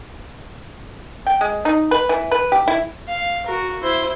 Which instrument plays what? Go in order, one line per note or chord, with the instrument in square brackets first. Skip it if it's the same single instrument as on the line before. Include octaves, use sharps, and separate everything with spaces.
[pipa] G5
G#3
D#4
B4
E3
B4
G4
E4
[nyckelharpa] F5
F#4 A#4
E4 C5